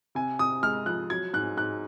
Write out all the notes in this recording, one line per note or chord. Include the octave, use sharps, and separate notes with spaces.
C3 G#5
C3 D#6
G#3 F6
F3 F#6
F#3 G#6
G#2 F#6
G#2 F#6